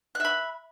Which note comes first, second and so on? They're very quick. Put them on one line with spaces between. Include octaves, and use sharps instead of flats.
F#6 E5 B5